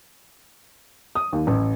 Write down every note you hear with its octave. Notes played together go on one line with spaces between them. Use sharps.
D#6
D#2
A1